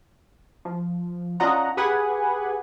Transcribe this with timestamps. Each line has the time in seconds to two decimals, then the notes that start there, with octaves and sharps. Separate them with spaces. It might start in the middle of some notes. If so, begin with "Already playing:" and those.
0.65 F3
1.40 C#4 D4 F4 D#5 F#5 A#5
1.77 G4 G#4 B4 F#5 G#5